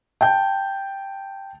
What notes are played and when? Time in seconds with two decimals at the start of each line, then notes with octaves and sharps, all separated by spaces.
0.21 G5 A5 G6